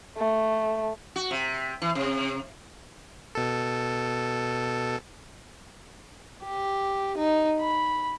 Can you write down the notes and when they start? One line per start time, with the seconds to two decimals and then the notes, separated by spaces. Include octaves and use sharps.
0.17 A3
1.16 F#4
1.31 C3
1.82 E3
1.95 C3
3.35 B2 A4
6.44 G4
7.17 D#4
7.60 B5